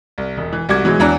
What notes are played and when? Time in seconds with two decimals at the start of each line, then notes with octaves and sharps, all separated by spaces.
0.18 C2
0.37 E1
0.53 E3
0.69 C2 G3 F#4 D6 G#6
0.84 B2 E3 F#3 G#3
0.99 E2 E3 F#3 D4 A#5 F#6